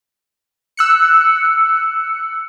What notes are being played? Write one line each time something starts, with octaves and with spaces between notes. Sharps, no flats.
E6 F#6 C#7